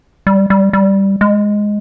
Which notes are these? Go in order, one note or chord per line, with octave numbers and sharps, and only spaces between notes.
G3
G3
G3
G#3